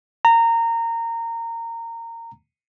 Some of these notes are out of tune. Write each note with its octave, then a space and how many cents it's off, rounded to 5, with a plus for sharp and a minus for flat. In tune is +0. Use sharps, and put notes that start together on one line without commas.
A#5 -20